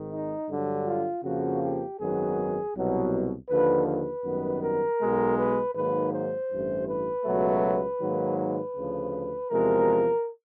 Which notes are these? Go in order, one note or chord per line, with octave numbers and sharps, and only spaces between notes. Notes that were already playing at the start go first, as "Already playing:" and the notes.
Already playing: G#1 G#2 D#3
D#4
G2 D3 F#3
F4
F2 C#3 F3 A#3 F#4
G4
G#1 F#2 D#3 F#3 B3 G#4
C2 B2 F#3
D#2 D3 F3 B4
B4
G#1 F#2 D#3 G3 B3
A#4
B1 B2 G#3
B4
G#2 D#3 F#3 A#3 B4
C5
A1 G2 E3
B4
C#2 B2 F#3 A3
G#2 D#3 F#3 A#3
B4
D2 C#3 F3
E2 C3 F3 G#3 A#4